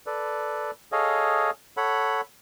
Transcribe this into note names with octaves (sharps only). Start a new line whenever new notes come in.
A4 B4 D5
G#4 A4 C#5 D#5 F5
A4 C#5 F#5 B5